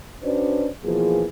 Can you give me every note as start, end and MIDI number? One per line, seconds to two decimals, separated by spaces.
0.23 0.69 61
0.23 0.69 62
0.23 0.69 66
0.23 0.69 71
0.23 0.69 72
0.23 0.69 74
0.84 1.25 47
0.84 1.25 52
0.84 1.25 53
0.84 1.25 58
0.84 1.25 68